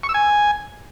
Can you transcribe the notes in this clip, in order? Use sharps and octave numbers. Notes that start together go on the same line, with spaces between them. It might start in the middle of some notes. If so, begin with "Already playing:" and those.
C#6
E6
G#5